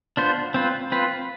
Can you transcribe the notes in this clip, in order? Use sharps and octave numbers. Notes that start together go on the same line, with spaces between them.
B3 D4 F4 C5
C4 F4 B4
C4 F4 B4